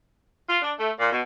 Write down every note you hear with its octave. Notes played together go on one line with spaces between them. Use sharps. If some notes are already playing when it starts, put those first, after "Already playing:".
F4
D4
A3
A#2
B2